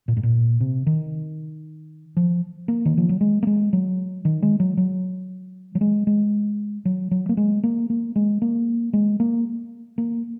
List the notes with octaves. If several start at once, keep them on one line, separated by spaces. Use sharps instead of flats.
A#2
G#2
A#2
C3
D#3
F3
A#3
D#3
F3
F#3
G#3
A#3
G#3
F#3
D#3
G#3
F#3
F#3
F#3
G#3
G#3
F#3
F#3
A#3
G#3
A#3
A#3
G#3
A#3
G#3
A#3
A#3